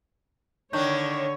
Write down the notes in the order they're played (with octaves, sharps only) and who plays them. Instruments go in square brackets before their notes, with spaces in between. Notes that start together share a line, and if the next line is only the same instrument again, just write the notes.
[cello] D3 [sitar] D#3 D4 [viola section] C#5 [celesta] C#6 G6